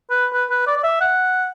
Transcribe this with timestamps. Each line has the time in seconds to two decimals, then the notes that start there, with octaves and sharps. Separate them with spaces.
0.10 B4
0.33 B4
0.50 B4
0.67 D5
0.77 D5
0.84 E5
1.01 F#5